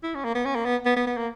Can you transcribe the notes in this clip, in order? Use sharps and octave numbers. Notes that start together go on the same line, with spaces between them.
E4
C#4
A#3
B3
C#4
A#3
B3
B3
B3
B3
A#3